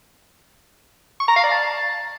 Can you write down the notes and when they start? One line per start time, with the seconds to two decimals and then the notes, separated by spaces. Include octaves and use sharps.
1.20 C#6
1.28 A#5
1.36 F5
1.44 D5
1.51 A5